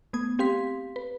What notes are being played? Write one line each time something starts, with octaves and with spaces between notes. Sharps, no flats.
A3 B3 D#6 G#6
C4 G4 F5 C6 B6
B4